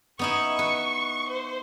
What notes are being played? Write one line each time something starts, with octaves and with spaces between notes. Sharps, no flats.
B3 D#4 E4 C#6
B4
C5